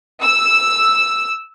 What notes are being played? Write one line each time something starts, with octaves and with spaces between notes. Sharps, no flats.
E6